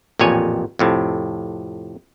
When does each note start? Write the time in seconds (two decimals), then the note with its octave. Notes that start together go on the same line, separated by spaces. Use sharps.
0.19 A1 F2 A#2 C#5 G#5
0.79 F2 A2 C3